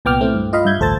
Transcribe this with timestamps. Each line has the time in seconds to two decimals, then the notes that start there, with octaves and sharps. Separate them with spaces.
0.05 C2 A#2 B3 G5 D6 F6
0.21 A3 C4 E4
0.35 G2
0.53 F4 D#5 F5 B5
0.65 G2 E5 G6 G#6
0.79 A1 D2 A4 C5 A5 A6